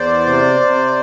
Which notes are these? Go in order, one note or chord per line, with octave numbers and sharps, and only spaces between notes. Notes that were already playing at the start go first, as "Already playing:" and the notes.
Already playing: E2 C5 D5
C3
C3